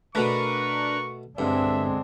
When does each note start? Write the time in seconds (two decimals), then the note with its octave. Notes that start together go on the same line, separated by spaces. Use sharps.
0.15 B2 A3 D4 A#4 B4 C#6
1.38 G2 D3 G#3 C4 D4 E5